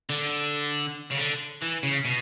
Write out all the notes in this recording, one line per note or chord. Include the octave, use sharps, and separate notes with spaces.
D3
C#3
D3
E3
C#3
B2